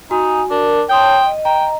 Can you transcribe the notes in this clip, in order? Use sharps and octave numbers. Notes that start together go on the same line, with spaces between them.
D#4 F#4 G#5
D4 A#4
C#5 G5 A5 C6 D#6 G6
D#5
G5 A#5